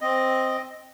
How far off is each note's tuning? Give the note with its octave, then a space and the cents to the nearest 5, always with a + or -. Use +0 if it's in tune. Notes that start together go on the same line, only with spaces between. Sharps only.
C4 +0 D#5 +0